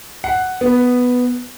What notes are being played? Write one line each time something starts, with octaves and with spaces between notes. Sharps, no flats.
F#5
B3